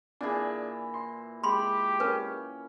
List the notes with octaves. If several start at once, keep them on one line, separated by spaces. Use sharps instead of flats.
A#2 E3 D4 G#4
C6
G#3 G4 B5 C6
C#4 A#4 B4